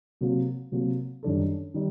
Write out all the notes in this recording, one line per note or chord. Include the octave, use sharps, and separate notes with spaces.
C3 F#3 A#3 F#4
C3 F#3 A#3 F#4
F#2 D#3 G3 D4 A4
D#3 G3